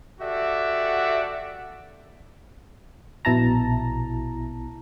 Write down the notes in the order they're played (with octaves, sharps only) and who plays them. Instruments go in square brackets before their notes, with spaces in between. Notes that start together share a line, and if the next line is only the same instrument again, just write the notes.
[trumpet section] F#4 G4 A4 D5 E5 F#5
[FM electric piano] A#1 B2 E4 A5 A#5